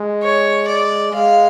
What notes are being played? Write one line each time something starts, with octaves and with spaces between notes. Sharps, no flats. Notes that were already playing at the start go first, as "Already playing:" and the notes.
Already playing: G#3
C#5
D5
G#3 F5